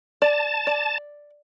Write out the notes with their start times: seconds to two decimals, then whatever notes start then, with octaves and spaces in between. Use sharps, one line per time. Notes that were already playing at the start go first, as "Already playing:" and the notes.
0.22 D5 A5
0.67 D5